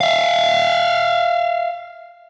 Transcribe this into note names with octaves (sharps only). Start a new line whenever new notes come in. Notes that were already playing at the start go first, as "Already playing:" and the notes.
E5 F5